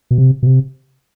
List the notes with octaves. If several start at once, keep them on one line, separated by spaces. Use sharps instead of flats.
B2
C3
B2
C3